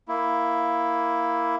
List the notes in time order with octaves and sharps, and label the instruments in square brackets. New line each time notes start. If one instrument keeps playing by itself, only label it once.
[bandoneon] A#3 E4